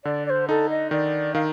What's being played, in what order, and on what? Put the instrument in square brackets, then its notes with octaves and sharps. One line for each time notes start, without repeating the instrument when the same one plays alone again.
[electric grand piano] D3 [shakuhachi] D5
[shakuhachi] D5
C5
[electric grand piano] D#4 [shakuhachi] A4
[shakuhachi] D#5
[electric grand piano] D#3 [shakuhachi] D5
[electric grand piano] D#3 [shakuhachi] F5